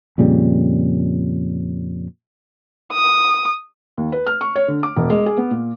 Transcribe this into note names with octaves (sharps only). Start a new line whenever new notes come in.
F2 A#2 C#3 G3
D#6
D#2
B4
F6
C#6
C#5
D3
D6
E1
G#3
G#4
B3
A#2